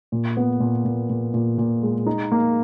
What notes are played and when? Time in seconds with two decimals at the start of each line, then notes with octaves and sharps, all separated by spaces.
0.12 A#2
0.37 B3
0.60 A#2
0.85 A#2
1.10 A#2
1.34 A#2
1.58 A#2
1.83 G#3
2.07 D#4
2.32 A#3